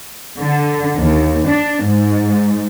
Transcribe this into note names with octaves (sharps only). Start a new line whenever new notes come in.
D3
D#2
D4
G#2